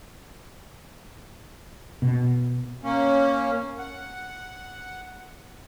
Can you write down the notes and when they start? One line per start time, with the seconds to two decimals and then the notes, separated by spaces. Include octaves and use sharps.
2.02 B2
2.84 A#3 C#4
3.79 F#5